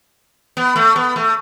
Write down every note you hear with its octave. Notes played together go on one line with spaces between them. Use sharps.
B3
A3
B3
A3